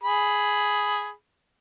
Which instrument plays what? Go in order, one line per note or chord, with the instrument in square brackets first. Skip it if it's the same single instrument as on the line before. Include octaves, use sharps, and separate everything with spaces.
[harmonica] G#4 B5